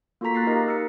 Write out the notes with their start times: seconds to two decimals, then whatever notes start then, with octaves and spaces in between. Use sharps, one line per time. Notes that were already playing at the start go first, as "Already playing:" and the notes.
0.21 A#3 F4 F#4 A4 A#5 B6
0.34 F#6 A6 A#6 C7
0.47 D#4 G4 A#4 D#5 F5
0.68 E6 C#7